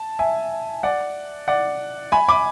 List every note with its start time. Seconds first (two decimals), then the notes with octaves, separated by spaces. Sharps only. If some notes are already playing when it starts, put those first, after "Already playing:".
Already playing: A5
0.19 E5 G#5
0.83 D5 F#5
1.48 D5 F#5
2.12 G#5 B5
2.28 B5 D6